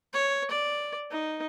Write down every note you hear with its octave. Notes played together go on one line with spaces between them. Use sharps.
C#5
D5
D#4